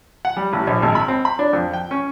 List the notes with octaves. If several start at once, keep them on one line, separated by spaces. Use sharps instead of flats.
F#5
G3
A1
A#1
G#1
B5
C4
B5
D4
F2
G5
C#4